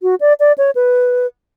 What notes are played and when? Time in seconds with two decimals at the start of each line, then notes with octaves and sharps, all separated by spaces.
0.02 F#4
0.20 D5
0.40 D5
0.58 C#5
0.75 B4